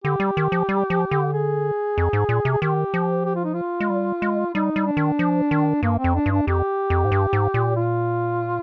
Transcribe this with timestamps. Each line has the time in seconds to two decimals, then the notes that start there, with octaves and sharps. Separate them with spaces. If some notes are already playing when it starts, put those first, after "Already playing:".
0.04 D3 G4
0.20 G3
0.37 D#3
0.52 F3
0.69 G3
0.90 F3
1.11 D3
1.33 G#4
1.98 F2
2.13 G#2
2.29 A#2
2.45 C3
2.52 G#4
2.62 D#3 G4
2.94 F3
3.26 G4
3.36 F4
3.44 D#4
3.54 F4
3.80 G#3
3.90 G3
4.22 G#3
4.54 G3 D#4
4.76 G3
4.87 D4
4.97 D#3
5.19 F3
5.51 D#3
5.82 G2 A#3
5.99 C4
6.04 F2
6.15 D4
6.26 G2
6.31 D4
6.47 F2 G4
6.90 F2
7.05 G#2
7.12 G2
7.33 G#2
7.54 A#2
7.76 F4